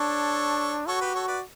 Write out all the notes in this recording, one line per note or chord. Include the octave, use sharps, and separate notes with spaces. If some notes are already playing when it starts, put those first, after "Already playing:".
Already playing: D4 A4 C#5
F#4 A4 C#5
G4 B4
A4 C#5
B4 D5